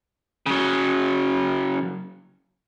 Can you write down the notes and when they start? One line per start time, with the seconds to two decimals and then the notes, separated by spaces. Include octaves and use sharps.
0.46 C#3 F#3